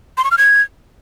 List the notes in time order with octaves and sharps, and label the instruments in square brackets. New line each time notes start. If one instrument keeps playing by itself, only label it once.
[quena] C6
C#6
F6
G#6